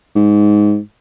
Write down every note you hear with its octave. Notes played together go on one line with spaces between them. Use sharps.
G#2